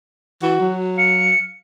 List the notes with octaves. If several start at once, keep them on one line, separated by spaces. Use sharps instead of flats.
E3 F#4
F#3
F5 C#7